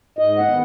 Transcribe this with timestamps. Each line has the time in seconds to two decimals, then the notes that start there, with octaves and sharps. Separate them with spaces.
0.19 G#2 D#5
0.38 F#5
0.48 D#3 B3